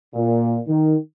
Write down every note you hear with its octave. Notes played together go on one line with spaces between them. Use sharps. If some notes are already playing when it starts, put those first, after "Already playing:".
A#2
D#3